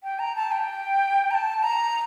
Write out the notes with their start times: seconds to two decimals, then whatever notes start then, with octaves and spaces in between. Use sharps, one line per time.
0.04 G5
0.19 A#5
0.36 A5
0.52 G5
1.31 A#5
1.34 A5
1.63 A#5